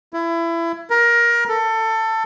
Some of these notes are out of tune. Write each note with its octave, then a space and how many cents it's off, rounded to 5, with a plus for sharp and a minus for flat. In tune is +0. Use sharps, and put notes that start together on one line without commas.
E4 +25
A#4 +20
A4 +20